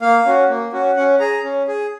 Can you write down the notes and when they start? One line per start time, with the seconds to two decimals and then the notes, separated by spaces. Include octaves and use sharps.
0.01 A#3 F5
0.25 C#4 F#4
0.49 A#3
0.73 C#4 F#4
0.96 C#4 F#5
1.20 G#4 A#5
1.44 C#4
1.67 G#4